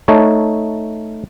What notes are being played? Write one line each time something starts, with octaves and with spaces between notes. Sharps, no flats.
A3 D#4 C#5 A5